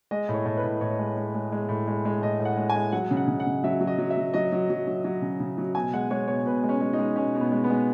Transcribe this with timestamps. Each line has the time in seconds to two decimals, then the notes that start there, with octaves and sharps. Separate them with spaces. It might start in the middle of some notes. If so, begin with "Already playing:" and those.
0.11 G#3 D#5
0.29 A2
0.34 C#5
0.46 A2
0.57 B4
0.64 A2
0.81 A2 C#5
0.99 G#3
1.17 G#3
1.35 G#3
1.52 G#3
1.69 A2
1.87 G#3
2.05 G#3
2.22 A2 D#5
2.40 A2
2.45 F#5
2.57 G#3
2.70 G#5
2.76 G#3
2.92 F#3 F#5
3.11 C#3
3.17 F#5
3.28 C#3
3.40 F#5
3.46 C#3
3.64 F#3 E5
3.81 F#3
3.87 D#5
3.98 F#3
4.10 E5
4.17 F#3
4.34 F#3 D#5
4.52 F#3
4.70 F#3
4.87 F#3
5.05 F#3
5.22 C#3
5.40 C#3
5.58 F#3
5.75 B2 G#5
5.93 G#3 F#5
6.11 G#3 C#5
6.28 B2 C#5
6.46 B2 B4
6.64 G#3
6.69 C#4
6.81 G#3
6.93 D#4
6.99 G#3
7.16 B2 C#4
7.35 B2
7.41 B3
7.52 G#3
7.64 B3
7.70 G#3